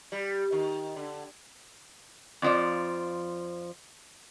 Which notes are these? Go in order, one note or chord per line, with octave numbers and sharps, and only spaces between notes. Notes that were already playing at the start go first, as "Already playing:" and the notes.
G3
D#3
D3
F2 F3 D5